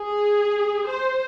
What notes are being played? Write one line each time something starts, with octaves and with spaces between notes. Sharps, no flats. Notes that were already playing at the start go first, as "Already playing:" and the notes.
Already playing: G#4
C5